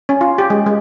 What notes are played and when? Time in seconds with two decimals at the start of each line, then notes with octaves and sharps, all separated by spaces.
0.09 C#4
0.21 F4
0.38 G4
0.50 G#3
0.66 G#3